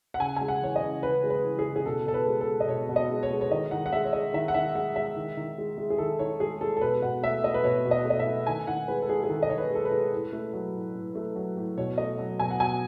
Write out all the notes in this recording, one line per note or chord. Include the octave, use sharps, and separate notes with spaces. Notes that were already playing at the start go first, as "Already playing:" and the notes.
F#5
C#3 G#5
G#3 G#5
F#5
E3 C#5
D#5
C#3
C#3 B4
G#3
B4
E3
G#4
C#3
G#4
B2 A4
B2 A4
B4
G#3
A4
G#3
D#5
B2 C#5
B2
D#5
G#3
C#5
G#3
C#5
D#3 D#5
D#3 F#5
F#5
G#3 E5
C#5
G#3 D#5
D#3 E5
F#5
D#3 E5
G#3 F#5
G#3 E5
D#3
D#3
G#3
G#3
G#4
D#3 A4
D#3 C#5
G#3 G#4
G#3 A4
A4
B2 B4
B2 F#5
A3 E5
A3 D#5
B4
B2 C#5
B2
D#5
A3
D#5
E5
A3
D#3 G#5
D#3 F#5
G#3 B4
A4
G#3 G#4
G#4
D#3 A4
D#5
D#3 C#5
B4
G#3 A4
B4
G#3
A2
A3
F#3
A2
A2
A3
F#3
A2
B2 C#5
A3 D#5
F#3
B2 G#5
F#5
B2 G#5